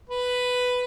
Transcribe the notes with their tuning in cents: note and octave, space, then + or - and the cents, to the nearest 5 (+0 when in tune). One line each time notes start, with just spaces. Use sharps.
B4 +5